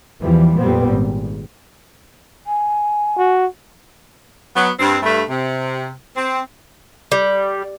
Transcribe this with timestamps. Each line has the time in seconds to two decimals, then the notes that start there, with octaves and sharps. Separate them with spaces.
0.21 E2 E3 F3 G3
0.56 F2 A#2 G3 B3 C4
0.87 G#1
2.47 G#5
3.18 F#4
4.54 F#3 B3
4.79 G2 C4
5.01 G2 A3
5.28 C3
6.16 C4
7.12 G3